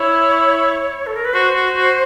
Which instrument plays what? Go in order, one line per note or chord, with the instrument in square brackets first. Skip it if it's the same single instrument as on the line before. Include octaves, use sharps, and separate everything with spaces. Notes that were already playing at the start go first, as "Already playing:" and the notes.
Already playing: [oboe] E4 [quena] C#5
[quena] A4
A#4
B4
[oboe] F#4 [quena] C5
[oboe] F#4
F#4